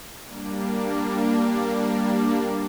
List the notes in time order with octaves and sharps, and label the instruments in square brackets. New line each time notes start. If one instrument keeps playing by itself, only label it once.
[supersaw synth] G3 A#3 D4